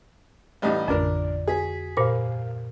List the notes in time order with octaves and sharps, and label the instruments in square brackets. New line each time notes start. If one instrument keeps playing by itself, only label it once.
[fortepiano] A1 G3 D#4
[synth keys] A1 D5 [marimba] F2 D3 [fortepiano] D4 A#4
[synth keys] F#4 B6 [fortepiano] G#4
[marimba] G2 A#2 C5 [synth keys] A#4 F5